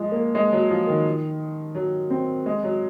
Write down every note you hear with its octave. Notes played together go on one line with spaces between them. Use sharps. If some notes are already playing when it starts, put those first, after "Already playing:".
Already playing: F3 G#3
A#3
G#3
F#3
F3
D#3
F#3
C4
G#3
F#3